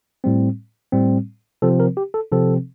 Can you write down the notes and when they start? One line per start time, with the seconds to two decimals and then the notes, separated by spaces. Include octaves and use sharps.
0.24 A2 G3 C4
0.93 A2 G3 C4
1.62 C3 F3 C4 A4
1.80 A#4
1.97 G4
2.14 A4
2.32 C3 F3 C4 A4